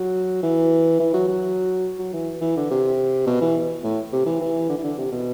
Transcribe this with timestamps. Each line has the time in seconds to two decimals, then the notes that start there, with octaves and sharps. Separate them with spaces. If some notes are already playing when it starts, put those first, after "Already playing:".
Already playing: F#3
0.43 E3
1.00 E3
1.14 F#3
1.28 F#3
1.99 F#3
2.13 E3
2.41 E3
2.56 D3
2.71 C3
3.26 B2
3.41 E3
3.84 A2
4.13 C3
4.26 E3
4.41 E3
4.69 D3
4.78 E3
4.84 D3
4.98 C3
5.12 B2